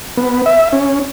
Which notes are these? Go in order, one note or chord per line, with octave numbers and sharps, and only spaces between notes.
B3
E5
C#4